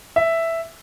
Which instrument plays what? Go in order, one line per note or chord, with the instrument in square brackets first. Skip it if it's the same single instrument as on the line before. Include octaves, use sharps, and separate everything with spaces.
[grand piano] E5